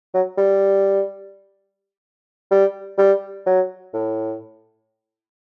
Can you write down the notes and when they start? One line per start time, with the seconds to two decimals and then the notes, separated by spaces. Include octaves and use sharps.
0.14 F#3
0.38 G3
2.51 G3
2.98 G3
3.46 F#3
3.94 A2